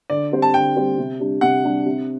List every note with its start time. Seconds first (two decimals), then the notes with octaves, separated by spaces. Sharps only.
0.10 D3 D5
0.32 G3 C4 G4 C5
0.42 A5
0.54 D3 G5
0.76 G3 C4 G4 C5
0.98 C3
1.20 G3 D4
1.41 C3 F#5
1.64 G3 D4
1.86 C3